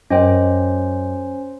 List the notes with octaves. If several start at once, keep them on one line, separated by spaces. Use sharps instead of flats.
F#2 C#4 C5 D#5 G5